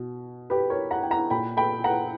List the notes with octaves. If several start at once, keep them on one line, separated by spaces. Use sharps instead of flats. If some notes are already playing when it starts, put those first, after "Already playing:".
Already playing: B2
G4 B4
A#4 C#5
F#5 A#5
G5
F#5 A#5
A#2 G5 B5
G5 B5
F#5 A#5